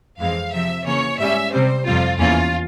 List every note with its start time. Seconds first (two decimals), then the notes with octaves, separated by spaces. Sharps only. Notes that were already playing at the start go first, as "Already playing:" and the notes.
0.19 F2 E3 G#3 C4 F5
0.53 C3 F3 C4 E5
0.85 C#3 E3 A#3 C#4 C#5
1.19 G#2 G3 C#4 E5
1.52 C3 G3 C4 C5
1.85 F2 C3 G3 C4 F4
2.18 E2 E3 A#3 C#4 F4